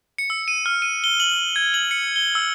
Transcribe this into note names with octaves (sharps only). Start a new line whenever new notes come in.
C#7
E6
D#7
F6
D#7
G7
F#7
G#6
F#7
C#7
G7
E6